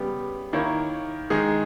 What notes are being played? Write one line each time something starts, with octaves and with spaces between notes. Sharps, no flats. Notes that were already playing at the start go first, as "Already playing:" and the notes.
Already playing: C#3 G3 B3 G4
D#3 A#3 E4 A#4 C#5
D#3 G#3 D#4 G#4